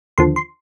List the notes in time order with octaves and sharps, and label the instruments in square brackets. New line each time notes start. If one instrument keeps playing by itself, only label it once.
[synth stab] D#2 D3 F3 C6
C6